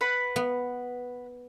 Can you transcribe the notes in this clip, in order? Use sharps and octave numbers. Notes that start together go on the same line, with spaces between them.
B4 F#5 B5
B3